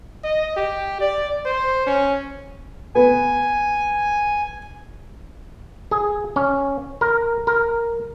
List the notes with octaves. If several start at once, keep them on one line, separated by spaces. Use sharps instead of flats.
D#5
G4
D5
C5
C#4
B3 G#5
G#4
C#4
A#4
A#4